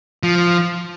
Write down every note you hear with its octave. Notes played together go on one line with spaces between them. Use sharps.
F3